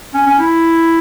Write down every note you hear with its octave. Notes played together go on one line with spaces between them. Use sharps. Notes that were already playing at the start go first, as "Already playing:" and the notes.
C#4
C#4
E4